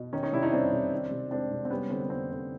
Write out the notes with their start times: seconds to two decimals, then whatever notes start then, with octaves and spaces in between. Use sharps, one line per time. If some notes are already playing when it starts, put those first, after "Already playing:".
Already playing: B2
0.13 D#3 C#4 D#4
0.23 C#4 D#4
0.33 C3 D4 E4
0.43 C#4 D#4
0.52 G3 C4 D4
0.73 C3
0.93 D#3
1.11 C3
1.31 G#3 C4 D4
1.52 C3
1.65 C4
1.70 G3 B3 C#4
1.90 D3 C4
2.00 B3
2.10 A#3 C4
2.31 D3